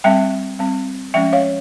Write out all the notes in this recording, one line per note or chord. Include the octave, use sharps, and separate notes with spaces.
G3 C4 E5 G5
G3 C4
F3 G#3 C#4 E5 G5
C#5 F5